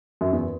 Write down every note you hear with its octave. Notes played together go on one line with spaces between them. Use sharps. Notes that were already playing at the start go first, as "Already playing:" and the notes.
F#2
E2